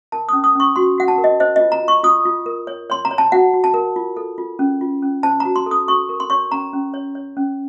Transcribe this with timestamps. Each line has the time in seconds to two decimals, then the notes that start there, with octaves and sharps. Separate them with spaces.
0.12 A#4 A5
0.29 C#4 D#6
0.44 D#6
0.55 C#4 C#6
0.76 F#4 C6
0.98 F#4 F#5
1.08 A5
1.18 A#4
1.24 D#5
1.40 C5 D#5
1.56 F4 D#5
1.72 A#5
1.83 F4
1.88 C#6
2.04 F4 D#6
2.25 F4
2.46 A#4
2.67 C#5
2.90 C#5 C6
3.05 A#5
3.11 C#5
3.18 A5
3.32 F#4 F#5
3.53 F#4
3.64 A5
3.74 A#4
3.96 F4
4.17 A4
4.38 F4
4.59 C#4
4.81 F4
5.02 C#4
5.23 C5 A5
5.40 F#4 A#5
5.56 C6
5.66 A4 D#6
5.87 F#4 C#6
6.09 A#4
6.20 C6
6.30 C#5 C#6
6.51 C#4 A#5
6.73 C#4
6.94 C#5
7.15 C#5
7.37 C#4